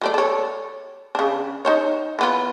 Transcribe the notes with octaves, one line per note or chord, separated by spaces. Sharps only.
F#3 A3 D5
A4 C#5
C#3 D4
D#4 C5 C#5
E3 B3 F4